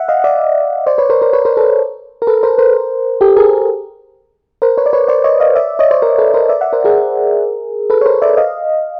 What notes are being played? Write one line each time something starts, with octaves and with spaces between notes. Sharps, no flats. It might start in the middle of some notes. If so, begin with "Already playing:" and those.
Already playing: E5 F#5
D#5 F5
D5 E5
C5 D5
B4 C#5
A#4 C5
A#4 C5
B4 C#5
A#4 C5
A4 B4
A#4
A4 B4
A#4 C5
A#4 C5
G4 A4
G#4 A#4
A#4 C5
B4 C#5
D5
B4 C#5
C5 D5
C#5 D#5
D#5 F5
D5 E5
C#5 D#5
C5 D5
A#4 C5
A4 B4
A#4 C5
D5 E5
E5 F#5
A#4 C5
G#4 A#4
A4 B4
C#5
A#4 C5
D5 E5
D#5 F5